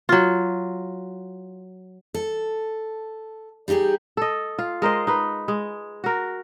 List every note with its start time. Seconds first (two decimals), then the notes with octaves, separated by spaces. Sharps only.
0.09 F#3 F4
2.14 A4
3.68 G3 D#4 F4 G4 G#4
4.17 A4 D#5
4.59 F4
4.82 G#3 A#4 C5 D#5
5.07 D#4 B4
5.48 G#3
6.04 F#4 A#4